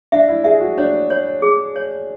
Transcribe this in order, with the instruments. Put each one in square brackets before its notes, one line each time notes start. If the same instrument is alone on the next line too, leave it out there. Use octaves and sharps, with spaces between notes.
[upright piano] D4 [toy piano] E5
[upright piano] E4
[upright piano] G#4 [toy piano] E5
[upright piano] F#4
[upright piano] D4 [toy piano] C#5
[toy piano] C#5
G#4
C#5